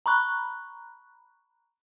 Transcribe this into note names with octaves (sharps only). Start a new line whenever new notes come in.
A#5 B5 C#6 F#6